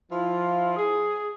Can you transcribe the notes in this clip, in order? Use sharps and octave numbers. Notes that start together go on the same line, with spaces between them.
F3 E4 F4
G#4